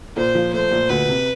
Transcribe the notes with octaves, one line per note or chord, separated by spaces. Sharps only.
A#2 C5
F3
A3 C5
A#2
D2 B4
C3